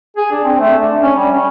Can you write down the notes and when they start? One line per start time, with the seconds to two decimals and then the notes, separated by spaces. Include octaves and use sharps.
0.17 G#4
0.32 D4
0.45 C4
0.60 A3
0.81 D4
1.02 C#4
1.16 G3
1.33 C#4